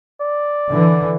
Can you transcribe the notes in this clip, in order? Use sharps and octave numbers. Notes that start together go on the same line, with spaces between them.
D5
D3 E3